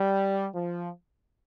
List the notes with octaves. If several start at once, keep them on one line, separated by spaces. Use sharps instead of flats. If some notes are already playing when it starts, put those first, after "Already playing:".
Already playing: G3
F3